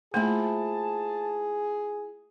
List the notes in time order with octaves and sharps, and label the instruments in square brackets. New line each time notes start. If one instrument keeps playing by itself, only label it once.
[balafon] A3 A#3 [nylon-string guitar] E4 F4 C5 [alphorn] G#4 [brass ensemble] A5